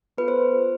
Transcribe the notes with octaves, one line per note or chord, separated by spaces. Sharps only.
B3 F4 A4 B4
C5